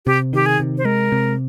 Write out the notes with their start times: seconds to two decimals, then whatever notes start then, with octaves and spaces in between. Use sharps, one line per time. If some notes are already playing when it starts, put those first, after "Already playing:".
0.06 C3 G4
0.33 D#3 G4
0.46 G#4
0.59 C3
0.78 C5
0.85 G#3 A#4
1.12 C3